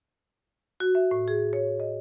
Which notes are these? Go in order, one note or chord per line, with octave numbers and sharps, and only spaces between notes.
F#4
E5
A2
G#4
C#5
D#5